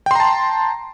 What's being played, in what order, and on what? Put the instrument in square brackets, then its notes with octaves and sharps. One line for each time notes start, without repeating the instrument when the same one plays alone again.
[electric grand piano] G5
C6
A#5
A5